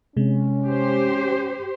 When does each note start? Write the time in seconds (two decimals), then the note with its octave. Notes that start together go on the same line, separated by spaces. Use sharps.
0.17 C3 G#3 C#4
0.66 G4 C5